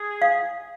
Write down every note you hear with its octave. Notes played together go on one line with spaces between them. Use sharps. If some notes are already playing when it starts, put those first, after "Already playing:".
Already playing: G#4
F5